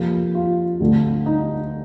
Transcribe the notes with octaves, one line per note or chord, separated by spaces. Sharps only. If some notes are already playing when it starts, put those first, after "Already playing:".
Already playing: F2 C3 F3 A#3
F4
D2 D3 A3
D#4